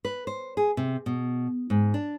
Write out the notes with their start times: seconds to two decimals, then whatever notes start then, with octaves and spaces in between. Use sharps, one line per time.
0.05 B4
0.27 C5
0.57 G#4
0.77 C3
1.06 B2
1.70 G#2
1.94 D4